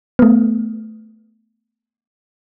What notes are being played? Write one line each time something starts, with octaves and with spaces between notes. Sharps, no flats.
A3 B3